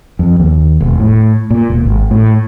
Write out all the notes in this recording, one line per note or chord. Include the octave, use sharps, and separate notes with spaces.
F2
D#2
E1
A2
A#2
E1
G#1
A2